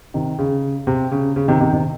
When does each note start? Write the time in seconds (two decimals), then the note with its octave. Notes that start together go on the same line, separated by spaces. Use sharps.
0.14 C3 D#3
0.39 C#3
0.87 C3
1.12 C#3
1.36 C#3
1.48 C3 D#3
1.60 C3 D#3
1.73 C3 D#3